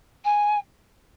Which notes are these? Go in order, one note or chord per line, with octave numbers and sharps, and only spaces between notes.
G#5